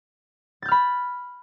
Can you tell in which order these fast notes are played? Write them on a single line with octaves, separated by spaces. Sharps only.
A6 G6 F6 B5